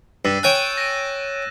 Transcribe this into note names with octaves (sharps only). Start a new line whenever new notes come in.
G2 E6 A6 D#7
C#5 G5 G#5 F#6 G6 E7
A#6 D#7